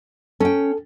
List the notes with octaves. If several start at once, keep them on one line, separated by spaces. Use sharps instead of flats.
C#4 A4 G5